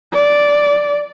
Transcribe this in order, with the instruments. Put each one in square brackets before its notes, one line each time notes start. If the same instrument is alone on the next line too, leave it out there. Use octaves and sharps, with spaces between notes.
[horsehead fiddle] D5